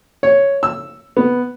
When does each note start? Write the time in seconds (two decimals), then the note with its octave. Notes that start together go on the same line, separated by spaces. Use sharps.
0.23 C#5
0.63 E6
1.17 B3